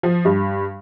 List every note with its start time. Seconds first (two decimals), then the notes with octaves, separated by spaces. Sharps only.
0.03 F3
0.25 G2